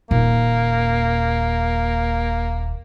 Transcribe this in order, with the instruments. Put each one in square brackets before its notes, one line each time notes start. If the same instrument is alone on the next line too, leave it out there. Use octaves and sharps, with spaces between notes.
[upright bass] D#1 [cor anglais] A#3